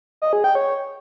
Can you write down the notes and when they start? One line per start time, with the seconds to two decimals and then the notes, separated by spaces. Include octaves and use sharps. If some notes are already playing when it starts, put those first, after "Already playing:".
0.22 D#5
0.33 G#4
0.44 G5
0.55 C#5